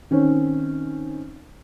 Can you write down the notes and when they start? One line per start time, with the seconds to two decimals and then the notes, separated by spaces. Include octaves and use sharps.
0.11 D#3 C4 C#4